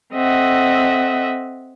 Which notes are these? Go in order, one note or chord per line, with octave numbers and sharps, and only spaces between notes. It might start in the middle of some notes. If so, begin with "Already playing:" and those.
C4 A4 D#5 E5 F#5